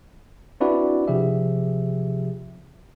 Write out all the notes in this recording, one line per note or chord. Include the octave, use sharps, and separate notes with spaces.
C4 D4 E4 F#4 B4 D5
C3 F3 G4 G#4 E5